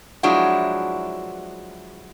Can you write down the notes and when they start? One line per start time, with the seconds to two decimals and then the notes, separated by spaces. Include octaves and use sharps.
0.23 F3 F#3 G#3 D4 E4 F#4